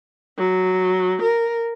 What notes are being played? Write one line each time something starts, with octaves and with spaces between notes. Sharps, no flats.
F#3
A#4